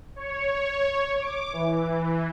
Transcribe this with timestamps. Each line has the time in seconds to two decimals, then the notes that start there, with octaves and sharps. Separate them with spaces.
0.16 C#5
1.19 D6
1.53 E3